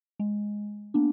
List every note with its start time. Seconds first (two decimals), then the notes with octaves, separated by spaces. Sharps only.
0.20 G#3
0.94 A#3 B3 D4